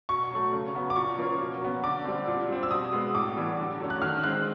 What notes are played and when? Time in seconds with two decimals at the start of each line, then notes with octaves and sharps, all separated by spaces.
0.09 B2 C#6
0.31 F#3 A3
0.53 C#3
0.74 F#3 B3
0.90 D6
0.96 A#2 C#6
1.18 F3 A#3 C#4
1.40 B2
1.61 F#3 B3
1.84 D3 D6
2.05 G3 C4
2.27 A#2
2.49 G3 C4
2.63 E6
2.71 B2 D#6
2.93 G#3 B3
3.14 A2 D6
3.36 E3 G3 B3
3.59 D3
3.80 F#3 A3 C#4
3.90 F#6
4.02 D#3 F6
4.24 G#3 C4 F#6